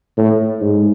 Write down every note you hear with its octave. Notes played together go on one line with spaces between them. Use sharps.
A2
G#2